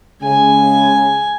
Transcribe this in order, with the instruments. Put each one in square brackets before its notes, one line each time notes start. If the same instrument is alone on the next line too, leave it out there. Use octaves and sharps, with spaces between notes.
[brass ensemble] C#3 G#3 [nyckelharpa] G#5